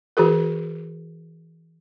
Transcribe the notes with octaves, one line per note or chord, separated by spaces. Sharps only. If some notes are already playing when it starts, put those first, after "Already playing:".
E3 F#4 G#4 A#4